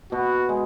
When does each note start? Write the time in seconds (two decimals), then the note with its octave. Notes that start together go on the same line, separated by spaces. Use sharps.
0.12 B2 F#4
0.49 G#3